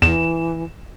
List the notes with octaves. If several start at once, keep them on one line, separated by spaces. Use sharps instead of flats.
E2 E3 E7